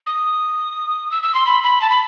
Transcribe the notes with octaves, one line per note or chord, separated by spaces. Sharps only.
D#6
E6
E6
C6
B5
B5
A5
B5